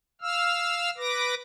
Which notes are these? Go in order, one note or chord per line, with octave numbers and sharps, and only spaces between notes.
F5 E6 F6
B4 D6 A#6